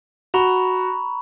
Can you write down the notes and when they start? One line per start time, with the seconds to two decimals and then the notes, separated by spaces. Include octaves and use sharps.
0.34 F#4 A#5 B5 C#6